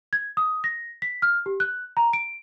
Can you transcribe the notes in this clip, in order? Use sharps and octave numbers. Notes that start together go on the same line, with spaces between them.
G#6
D#6
A#6
B6
F6
G4
F#6
A#5
D7